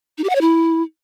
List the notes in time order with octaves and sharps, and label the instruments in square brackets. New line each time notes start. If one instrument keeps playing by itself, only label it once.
[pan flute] D#4
G4
F#5
C#5
E4